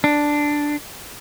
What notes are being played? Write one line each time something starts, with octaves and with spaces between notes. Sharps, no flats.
D4